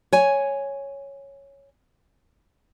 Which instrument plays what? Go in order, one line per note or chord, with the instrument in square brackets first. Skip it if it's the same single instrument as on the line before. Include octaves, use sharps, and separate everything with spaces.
[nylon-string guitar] C#5 G#5